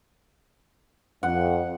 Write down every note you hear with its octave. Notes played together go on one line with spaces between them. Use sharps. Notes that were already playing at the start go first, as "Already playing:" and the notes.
F2 F#5